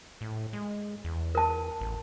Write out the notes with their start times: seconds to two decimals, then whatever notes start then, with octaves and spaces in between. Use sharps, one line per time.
0.21 A2
0.53 G#3
1.04 E2
1.35 A#4 A5
1.81 A1